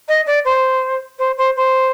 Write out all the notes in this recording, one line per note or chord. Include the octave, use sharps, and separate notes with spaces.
D#5
D5
C5
C5
C5
C5